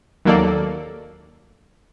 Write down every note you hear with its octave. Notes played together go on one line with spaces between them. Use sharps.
D#2 F#3 A#3 A4 D5